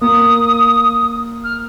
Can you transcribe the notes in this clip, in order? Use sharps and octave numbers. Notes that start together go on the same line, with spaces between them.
A#3 D#6
F6